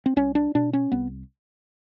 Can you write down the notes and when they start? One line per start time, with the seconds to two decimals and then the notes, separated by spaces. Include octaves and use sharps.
0.06 C4
0.16 C2 C#4
0.35 D4
0.55 B2 D4
0.73 C#4
0.92 C2 B3